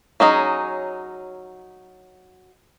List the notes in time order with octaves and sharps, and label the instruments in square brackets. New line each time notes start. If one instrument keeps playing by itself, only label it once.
[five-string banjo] F#3 C#4 D#4 G#4